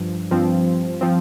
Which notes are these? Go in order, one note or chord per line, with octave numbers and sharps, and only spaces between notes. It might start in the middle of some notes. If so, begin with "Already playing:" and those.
Already playing: G2 F3
G2 F3 C4
F3 C4